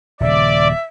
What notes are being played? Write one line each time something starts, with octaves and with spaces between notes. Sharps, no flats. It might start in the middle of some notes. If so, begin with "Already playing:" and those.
D#1 C#3 D5 E5